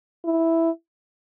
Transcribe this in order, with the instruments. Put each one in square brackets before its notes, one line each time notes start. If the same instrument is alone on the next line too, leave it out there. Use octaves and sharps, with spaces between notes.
[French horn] E4